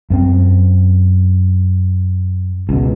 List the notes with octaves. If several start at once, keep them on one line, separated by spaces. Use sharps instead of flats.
F#2 B3 C4
C#2 B2